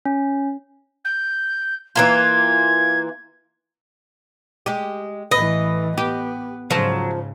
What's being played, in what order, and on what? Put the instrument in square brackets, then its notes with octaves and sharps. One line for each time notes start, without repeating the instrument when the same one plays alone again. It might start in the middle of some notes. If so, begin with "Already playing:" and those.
[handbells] C#4
[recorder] G6
[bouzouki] E3 A#3 F4 [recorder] G#6
[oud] G#3 G4
[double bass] A1 E3 [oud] B4 [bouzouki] D#5
[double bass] B3 [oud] G4
[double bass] G#2 C#3 [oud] F3 C5 [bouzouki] F#3